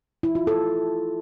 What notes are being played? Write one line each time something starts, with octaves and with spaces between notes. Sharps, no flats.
E4
F4
A4